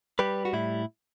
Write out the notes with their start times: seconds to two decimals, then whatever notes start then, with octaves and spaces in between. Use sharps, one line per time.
0.19 G3 G4 B4
0.45 F#4
0.53 A2 E4